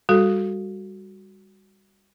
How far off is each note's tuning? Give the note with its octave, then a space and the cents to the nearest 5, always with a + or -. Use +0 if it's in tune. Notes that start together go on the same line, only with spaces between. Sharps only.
G3 +25 F#4 +0 A4 +0